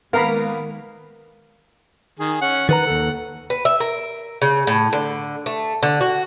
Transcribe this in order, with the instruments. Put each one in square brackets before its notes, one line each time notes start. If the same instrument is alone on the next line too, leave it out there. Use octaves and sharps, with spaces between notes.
[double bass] D#3 G#3 [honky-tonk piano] A#3 B3 [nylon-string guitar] A#4 [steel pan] F5 A#5 B5
[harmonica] D#3 G#4
C#4 F#5
[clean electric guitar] D#3 B4 A#5 [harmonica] F#5
[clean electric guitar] D#2 A4
[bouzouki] B4
E5
A#4
C#3
A2
D3
A3
D3
F#4